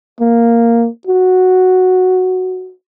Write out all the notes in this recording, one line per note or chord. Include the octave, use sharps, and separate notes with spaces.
A#3
F#4